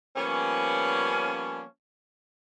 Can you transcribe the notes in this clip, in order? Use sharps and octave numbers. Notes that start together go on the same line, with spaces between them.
F3 G3 A#3 B3 C#4